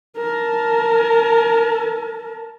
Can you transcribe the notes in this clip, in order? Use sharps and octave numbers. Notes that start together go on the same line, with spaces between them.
A#4 A5